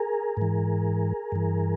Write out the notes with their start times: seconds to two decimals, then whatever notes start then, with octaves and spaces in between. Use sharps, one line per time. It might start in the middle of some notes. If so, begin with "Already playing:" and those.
Already playing: G#4 A#4
0.37 G#2 E3
1.32 G2 E3